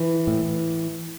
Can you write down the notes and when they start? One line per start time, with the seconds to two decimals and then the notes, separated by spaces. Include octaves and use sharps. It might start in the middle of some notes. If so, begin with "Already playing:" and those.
Already playing: E3
0.27 A2